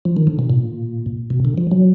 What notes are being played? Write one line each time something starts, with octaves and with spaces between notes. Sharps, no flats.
F3
D#3
D3
B2
A#2
B2
D3
F3
F#3